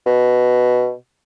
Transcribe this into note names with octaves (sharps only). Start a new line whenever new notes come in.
B2